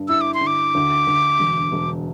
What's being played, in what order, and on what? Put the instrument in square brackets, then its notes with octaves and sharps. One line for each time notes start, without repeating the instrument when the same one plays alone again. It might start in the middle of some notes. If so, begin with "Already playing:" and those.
Already playing: [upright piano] G2 D3
[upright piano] E4 [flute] E6
[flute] D6
C6
[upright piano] D3
[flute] D6
[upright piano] D2
D2
E1
E1